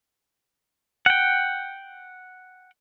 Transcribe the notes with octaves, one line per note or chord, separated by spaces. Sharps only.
F#5 G5